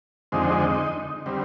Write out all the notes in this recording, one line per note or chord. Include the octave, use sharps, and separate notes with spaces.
F2 D3 G#3 C4 D#4
D3 G3 C4